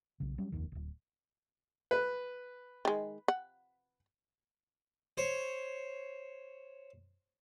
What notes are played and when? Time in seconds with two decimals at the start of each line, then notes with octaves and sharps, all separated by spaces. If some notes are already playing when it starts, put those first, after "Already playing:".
0.20 B1 C#3
0.38 F#3 G3 C#4
0.52 F1 A#1 D#2 D#3
0.72 D1 G#1
1.91 B4
2.85 D#3 G#3
3.28 F#5
5.17 C5 C#5